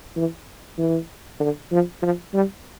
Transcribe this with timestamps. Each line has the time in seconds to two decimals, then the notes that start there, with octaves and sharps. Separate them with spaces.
0.16 E3
0.78 E3
1.40 D3
1.72 F3
2.02 F3
2.33 G3